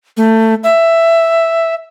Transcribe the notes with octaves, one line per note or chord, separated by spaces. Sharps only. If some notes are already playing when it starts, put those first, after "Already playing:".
A3
E5